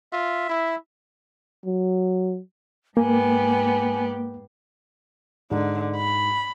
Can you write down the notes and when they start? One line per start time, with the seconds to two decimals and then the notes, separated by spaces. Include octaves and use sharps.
0.13 F4 E5
0.49 E4
1.65 F#3
2.97 G#2 A#3 B3 G4 G#5
5.51 G#2 D3
5.97 B5